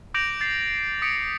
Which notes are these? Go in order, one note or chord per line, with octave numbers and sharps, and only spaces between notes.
D6 G6 A#6 D7 F7 F#7
A6 C7
D#6 B6 C#7 D7